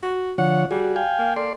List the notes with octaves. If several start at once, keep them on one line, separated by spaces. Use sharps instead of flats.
F#4
D3 F3 C#5 F#5
G3 F#4 G#4
F5 G5 G#5
A#3
A4 D5 C6